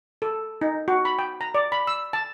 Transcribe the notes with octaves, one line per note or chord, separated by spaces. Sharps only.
A4
D#4
F#4
B5
G5
A#5
D5
B5
E6
A5